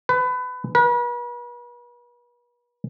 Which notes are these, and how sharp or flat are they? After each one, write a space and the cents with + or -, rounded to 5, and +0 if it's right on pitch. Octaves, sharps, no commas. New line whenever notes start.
B4 +25
B4 -40